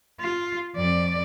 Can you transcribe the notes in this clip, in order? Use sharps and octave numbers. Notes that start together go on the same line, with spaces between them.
F4
F2 D5